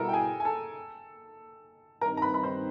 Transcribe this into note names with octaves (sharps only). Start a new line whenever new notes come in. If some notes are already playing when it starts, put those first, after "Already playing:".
Already playing: B2 G3 B3 E4 A4 A#4 A#5
G5
G#4 G#5
G#5
A4 A5
G2 D#3 G3 C4 D#4 A#4 A#5
A#5
B4 B5
B5
C5 C6